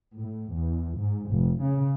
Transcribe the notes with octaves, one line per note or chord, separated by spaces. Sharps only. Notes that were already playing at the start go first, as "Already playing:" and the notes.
A2
E2
G#2
F1
C#3